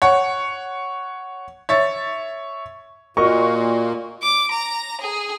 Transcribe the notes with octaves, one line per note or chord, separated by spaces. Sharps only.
C#5 F#5
C#5 E5 A6
A#2 F#4 A#4 D#5 C#6
D6
A#5
G#4